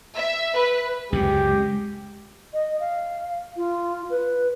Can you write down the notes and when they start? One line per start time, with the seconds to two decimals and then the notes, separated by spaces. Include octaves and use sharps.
0.16 E5
0.54 B4
1.12 C#2 F#2 C3 G#3 G4
2.53 D#5
2.80 F5
3.57 F4
4.10 B4